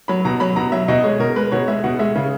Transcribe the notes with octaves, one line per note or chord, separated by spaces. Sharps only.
F#3 B5
B2 A#5
F#3 B5
B2 A#5
F#3 E5
B2 D#5
G#3 C#5
B2 A#4
G#3 B4
B2 C#5
G#3 E5
B2 F#5
G#3 E5
C#3